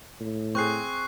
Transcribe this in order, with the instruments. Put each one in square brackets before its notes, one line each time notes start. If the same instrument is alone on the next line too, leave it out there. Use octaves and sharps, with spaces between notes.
[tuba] A2
[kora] C4 G#4 [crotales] C#6 F#6 C7